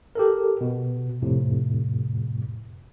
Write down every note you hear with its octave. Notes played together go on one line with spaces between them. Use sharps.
G4 A4 A#4
B2
F2 A2 C3